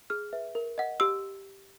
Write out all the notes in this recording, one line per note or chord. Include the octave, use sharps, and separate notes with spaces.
G#4 F6
B4 E5
A#4
D#5 F#5
G4 E6